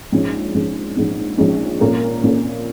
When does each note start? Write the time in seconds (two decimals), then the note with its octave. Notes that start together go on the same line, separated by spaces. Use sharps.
0.12 A#1 G#2 G#3 C#4
0.54 A#1 G#2 G#3 C#4
0.97 A#1 G#2 G#3 C#4
1.38 A#1 G#2 G#3 C#4
1.81 A#2 A#3 C#4 A#4
2.24 A#2 A#3 C#4 A#4